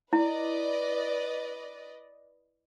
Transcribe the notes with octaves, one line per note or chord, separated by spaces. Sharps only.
E4 B4 D5 D#5